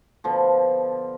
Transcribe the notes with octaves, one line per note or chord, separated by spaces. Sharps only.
B2 D3 F3